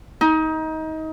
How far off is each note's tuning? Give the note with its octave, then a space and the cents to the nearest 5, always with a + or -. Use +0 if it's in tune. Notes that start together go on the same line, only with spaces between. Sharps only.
D#4 +25